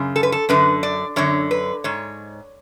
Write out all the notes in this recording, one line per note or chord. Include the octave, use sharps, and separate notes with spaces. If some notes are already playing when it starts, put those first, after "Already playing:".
Already playing: F#2 C#3
A4
B4
A4
F#2 D3 B4
D5
F#2 D3 C#5
B4
G#2 C#5